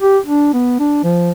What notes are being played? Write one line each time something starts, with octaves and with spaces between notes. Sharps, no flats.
G4
D4
B3
D4
F3